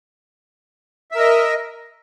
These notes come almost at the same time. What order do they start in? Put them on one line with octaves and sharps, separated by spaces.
E5 A#4 D#5